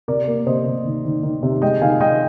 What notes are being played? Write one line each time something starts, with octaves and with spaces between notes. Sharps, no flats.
C3 A#4 D5
A#3
C3 C5 D#5
C3
D#3
D#3
D#3
C3
G#3 D#5 G5
D#3 F5 G#5
G#3 D#5 G5